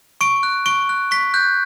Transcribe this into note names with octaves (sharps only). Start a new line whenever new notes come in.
C#6 D7
F#6
C#6 D7
F#6
C#6 B6
F#6 G6